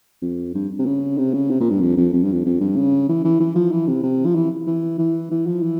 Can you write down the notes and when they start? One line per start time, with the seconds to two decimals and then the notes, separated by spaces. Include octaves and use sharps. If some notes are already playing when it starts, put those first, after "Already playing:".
0.22 F2
0.54 G2
0.79 C3
0.86 C#3
1.18 C3
1.34 C#3
1.50 C3
1.60 A#2
1.70 G2
1.81 F2
1.97 F2
2.13 F2
2.23 G2
2.32 F2
2.45 F2
2.60 G2
2.76 C#3
3.08 E3
3.24 E3
3.40 E3
3.55 F3
3.71 E3
3.87 C3
4.03 C3
4.26 F3
4.35 E3
4.67 E3
4.98 E3
5.31 E3
5.46 F3
5.62 E3